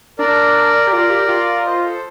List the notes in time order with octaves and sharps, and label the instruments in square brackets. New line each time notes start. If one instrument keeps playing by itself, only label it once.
[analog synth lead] D4 [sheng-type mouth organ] A#4 D5
[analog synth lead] G4
[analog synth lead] F4 [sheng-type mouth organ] A#4 D5
[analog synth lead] G4
F4
[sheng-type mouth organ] C5 D#5
A4 C5